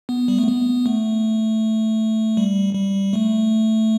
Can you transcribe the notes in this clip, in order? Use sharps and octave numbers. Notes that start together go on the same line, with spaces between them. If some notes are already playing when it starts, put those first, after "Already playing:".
B3
G3
A3
B3
A3
G3
G3
A3